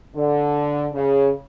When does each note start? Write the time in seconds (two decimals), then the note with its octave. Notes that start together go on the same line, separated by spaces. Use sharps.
0.15 D3
0.93 C#3